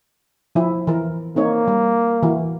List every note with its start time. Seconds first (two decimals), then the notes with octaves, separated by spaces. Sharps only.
0.55 F3 E4
0.87 E3 A#4
1.36 A#3 C4 D#4 C#5
1.68 G3
2.23 E3 F#4